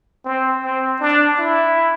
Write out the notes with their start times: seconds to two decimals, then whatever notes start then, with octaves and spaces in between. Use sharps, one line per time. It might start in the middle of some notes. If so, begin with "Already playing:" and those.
0.25 C4
0.63 C4
1.00 D4
1.39 E4